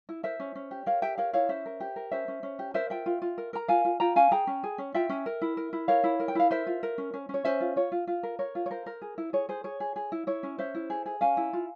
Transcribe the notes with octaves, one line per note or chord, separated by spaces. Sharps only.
E4
A#4 C5 E5
C#4
C#4
G4
A#4 C#5 F5
G4 E5 G5
A#4 C#5 F5
E4 C#5 F5
C#4 C5 E5
A#4
G4
A#4
C#4 C5 E5
C#4
C#4
G4
A#4 C5 E5
F4 E5 G5
F4
F4
A#4
A#4 A#5
F4 F5 G#5
F4
F4 G5 A#5
C#4 F5 G#5
G#4 G5 A#5
C#4
G#4
C#4
F4 E5 G5
C#4
A#4
E4
A#4
E4
A#4 C#5 F5
E4
A#4
G5
E4 F5
A#4 C5 E5
F4
A#4
C#4
C#4
C#4
C#5
C#4 C5 E5
F4
F4 C#5
F4
F4
A#4
A#4 C#5
F4
C#5
A#4 C5
A#4
G#4
E4
G#4 C#5
G#4 C5
G#4 C#5
G#4
G#4
E4
E4 C#5
C#4
C#4 C5 E5
E4
G#4
G#4
C#4 F5 G#5
E4
F4